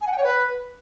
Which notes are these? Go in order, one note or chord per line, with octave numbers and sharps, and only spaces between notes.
G#5
F#5
G5
C#5
B4